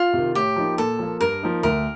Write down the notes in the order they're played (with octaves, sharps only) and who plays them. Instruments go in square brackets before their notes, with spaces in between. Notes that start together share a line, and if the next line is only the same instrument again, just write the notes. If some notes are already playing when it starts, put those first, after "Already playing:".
Already playing: [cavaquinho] F4
[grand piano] C3 D#3
[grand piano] A2 [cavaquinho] G4
[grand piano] F3 A#3 D#4
[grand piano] A#2 [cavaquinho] A4
[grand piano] F3 A#3
[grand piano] G2 [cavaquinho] A#4
[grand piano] F3 A#3 D#4
[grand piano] D2 [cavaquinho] A#4